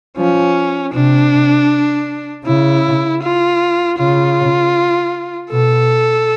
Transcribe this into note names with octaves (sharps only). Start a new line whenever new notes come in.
F3 C#4
C3 D4
C#3 E4
F4
C#3 F4
B2 A4